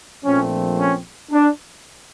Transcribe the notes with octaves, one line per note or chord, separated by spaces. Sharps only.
A#1 A#2 F3 A3 C4 C#4
C#4
D4